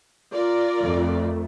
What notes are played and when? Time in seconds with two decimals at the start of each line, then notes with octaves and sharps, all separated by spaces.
0.35 F4 A#4 D5
0.80 F2 A3